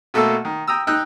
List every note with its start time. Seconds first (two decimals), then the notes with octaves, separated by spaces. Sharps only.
0.14 B2 A3 A#3 A4 E6
0.45 D#3
0.67 G5 A#5 D#6 E6
0.87 D#4 G5 E6 F#6